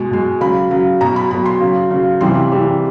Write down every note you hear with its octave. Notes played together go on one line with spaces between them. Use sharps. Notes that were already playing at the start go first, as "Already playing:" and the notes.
Already playing: B2 G#3
B2 G#3
C#3 F#3 B5
C#3 F#3
B2 F#3 A#5
B5
B2 F#3 B5
C6
C#3 F#3
C#3 F#3
C3 E3 G3 C6
C3 E3 G3